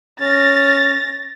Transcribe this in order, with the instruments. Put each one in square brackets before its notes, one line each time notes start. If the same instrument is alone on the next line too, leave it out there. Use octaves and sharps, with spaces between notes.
[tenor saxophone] C#4 [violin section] A6 A#6